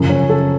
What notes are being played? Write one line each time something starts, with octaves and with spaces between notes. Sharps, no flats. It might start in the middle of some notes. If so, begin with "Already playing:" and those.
Already playing: F#2 C#3 F3
C#4
A4